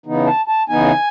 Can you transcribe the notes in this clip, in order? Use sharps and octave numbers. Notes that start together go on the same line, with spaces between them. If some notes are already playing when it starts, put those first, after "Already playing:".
C#3 E3 B3 D#4
A5
A5
C#3 E3 B3 D#4 G#5